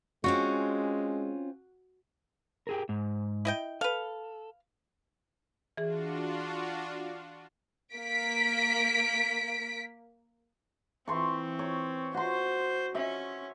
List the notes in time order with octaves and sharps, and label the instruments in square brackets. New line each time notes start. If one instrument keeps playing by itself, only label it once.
[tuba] G#3 [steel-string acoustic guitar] C4 C#4 F4 [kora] F#4
[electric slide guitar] G4 G#4 A#4
G#2
[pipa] E4 D#5 G5
[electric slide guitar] A4 [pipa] B4 F5
[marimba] E3 G#4 [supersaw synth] D4 F4 F#4
[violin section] A#3 B6 D7
[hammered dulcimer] E3 C6 C#6 [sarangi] C4
[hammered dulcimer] C#5
[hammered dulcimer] F#4 C6 [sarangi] C5
[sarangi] C#4 [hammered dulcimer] E5